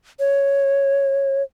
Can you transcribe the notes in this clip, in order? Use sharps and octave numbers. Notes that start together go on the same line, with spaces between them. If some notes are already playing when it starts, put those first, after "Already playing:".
C#5